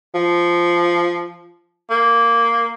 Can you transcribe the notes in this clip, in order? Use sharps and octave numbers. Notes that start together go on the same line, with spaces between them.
F3
A#3